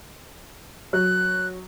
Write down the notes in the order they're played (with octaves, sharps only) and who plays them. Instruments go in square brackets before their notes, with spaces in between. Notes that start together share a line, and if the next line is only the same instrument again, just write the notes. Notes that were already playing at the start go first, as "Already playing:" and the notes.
[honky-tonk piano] F#3 [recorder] F#6